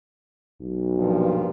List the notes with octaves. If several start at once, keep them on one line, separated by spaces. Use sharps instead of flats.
B1
G2 A#2 F3